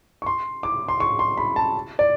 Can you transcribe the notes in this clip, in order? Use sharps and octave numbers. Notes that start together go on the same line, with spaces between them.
C#6
C6
D6
C6
C#6
C6
B5
A5
D5